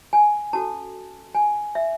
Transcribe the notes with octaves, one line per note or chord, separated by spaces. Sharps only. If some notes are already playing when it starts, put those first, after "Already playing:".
G#5
C#4 F#4 A4 A5
G#5
E5